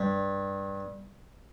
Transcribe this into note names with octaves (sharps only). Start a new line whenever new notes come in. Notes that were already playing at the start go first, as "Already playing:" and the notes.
Already playing: G2